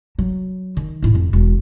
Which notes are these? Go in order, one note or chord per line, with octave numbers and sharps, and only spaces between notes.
F#3
D#3
A2 E4
F2
E1